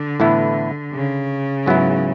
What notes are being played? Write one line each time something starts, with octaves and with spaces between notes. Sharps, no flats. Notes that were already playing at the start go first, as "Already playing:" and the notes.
Already playing: D3
A2 E3 B3 E4
C#3
G#2 F#3 B3 E4